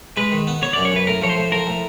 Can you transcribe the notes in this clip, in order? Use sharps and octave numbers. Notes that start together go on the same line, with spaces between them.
G#3 B4
D#3
B3
B3 C#5
D5
F#2
C#5
F#2 B4
A2 A#4
F3 C#5
C5
A2
F3 A#4
A2